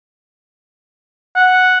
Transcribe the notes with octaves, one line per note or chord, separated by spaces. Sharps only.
F#5